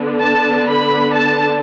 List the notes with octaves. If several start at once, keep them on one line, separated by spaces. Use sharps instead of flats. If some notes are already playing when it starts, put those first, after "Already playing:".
Already playing: D3 B3 D4
A5
B5
A5